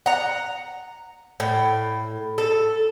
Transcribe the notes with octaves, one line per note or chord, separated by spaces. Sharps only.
F#5 A#5
A2
A4